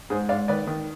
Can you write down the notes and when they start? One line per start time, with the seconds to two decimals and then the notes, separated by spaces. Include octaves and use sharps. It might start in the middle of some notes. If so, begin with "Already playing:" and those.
0.10 G#2 G#4 C5
0.29 G#2 D5 F5
0.48 D#3 B4 D5
0.67 D#3